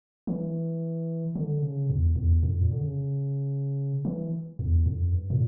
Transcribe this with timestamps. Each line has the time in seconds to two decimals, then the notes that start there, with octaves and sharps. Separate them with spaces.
0.27 E3
1.35 D3
1.62 C#3
1.90 E2
2.16 E2
2.43 F2
2.61 A#2
2.71 D3
2.80 C#3
4.05 E3
4.59 E2
4.86 F2
5.12 G2
5.30 A#2